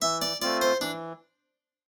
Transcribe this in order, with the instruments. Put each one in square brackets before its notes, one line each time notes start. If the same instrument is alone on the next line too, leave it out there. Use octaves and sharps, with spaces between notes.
[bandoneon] E3 [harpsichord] E5
[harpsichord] D5
[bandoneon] A3 C4 F4 [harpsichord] D5
[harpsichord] C5
[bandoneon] E3 [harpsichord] D4